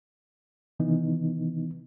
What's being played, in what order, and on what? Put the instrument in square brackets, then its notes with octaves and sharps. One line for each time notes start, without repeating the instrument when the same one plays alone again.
[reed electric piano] C3 D#3 E3 B3 D#4